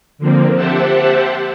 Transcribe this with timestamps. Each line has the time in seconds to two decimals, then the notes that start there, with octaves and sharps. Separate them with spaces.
0.18 D3 F3 A#3 C4
0.55 G4 C5 E5 F#5 A5